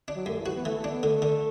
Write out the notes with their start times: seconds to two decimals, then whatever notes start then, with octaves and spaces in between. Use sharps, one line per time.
0.08 D4
0.16 F#3
0.26 F#2 A3
0.39 E3
0.46 F#4
0.56 B3
0.65 E3 A3
0.78 A3
0.84 D4
0.90 B3
1.03 D3 A3
1.22 D3